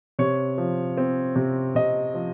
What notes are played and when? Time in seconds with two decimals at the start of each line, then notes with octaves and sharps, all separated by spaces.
0.19 C3 C#5
0.58 F3
0.97 C4
1.36 C3
1.75 C3 D#5
2.14 F3